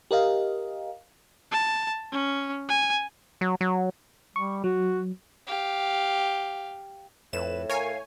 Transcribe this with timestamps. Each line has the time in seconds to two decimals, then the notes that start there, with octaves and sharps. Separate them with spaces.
0.11 G4 A#4 D#5 F5
1.52 A5
2.13 C#4
2.69 G#5
3.41 F#3
3.61 F#3
4.36 G3 C#6
4.64 F#3 F#4
5.47 G4 F5
7.33 F2 A2 B4 E7
7.70 A#4 C#5 F5 G#5